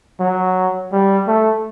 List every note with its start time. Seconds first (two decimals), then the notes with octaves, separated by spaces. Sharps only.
0.20 F#3
0.92 G3
1.27 A3